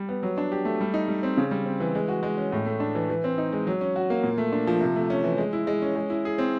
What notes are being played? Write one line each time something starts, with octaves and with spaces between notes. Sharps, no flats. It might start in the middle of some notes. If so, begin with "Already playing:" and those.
Already playing: G3
B3
F#3
D4
G4
A3
G3
D#4
G3
C4
C#3
G3
C4
E3
G#3
F#4
G#3
C#4
A2
A3
D4
E3
E3
C4
D#4
G#3
F#3
C#4
F#4
A#3
A#2
A3
D4
F3
C3
A3
C#4
E3
G#3
E4
G#3
C#4
G#3
E4
G#4
C4